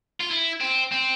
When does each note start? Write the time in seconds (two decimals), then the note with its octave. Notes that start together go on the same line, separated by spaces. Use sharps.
0.21 F4
0.30 E4
0.61 C4
0.92 C4